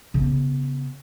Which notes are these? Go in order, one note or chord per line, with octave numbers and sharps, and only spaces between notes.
C#3 B3